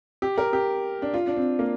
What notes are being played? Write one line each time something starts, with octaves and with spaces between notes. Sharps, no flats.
G4
A#4
G4
D4
F4
D4
C4
A#3